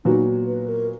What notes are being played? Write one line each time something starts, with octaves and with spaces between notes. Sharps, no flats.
A#2 F#3 B3 D#4 F#4
B4
A#4